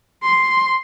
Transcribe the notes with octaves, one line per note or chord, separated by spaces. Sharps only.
C6